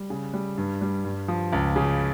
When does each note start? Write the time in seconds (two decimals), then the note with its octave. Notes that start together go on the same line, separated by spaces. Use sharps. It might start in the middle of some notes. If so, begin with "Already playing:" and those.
Already playing: G3
0.10 C#3
0.34 G3
0.58 G2
0.81 G3
1.05 G2
1.28 F3
1.53 C#2
1.76 C#3